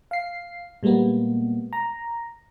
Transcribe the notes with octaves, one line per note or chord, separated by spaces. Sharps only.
F5 C7
A#2 G3 G#3 A#3 B3
A#5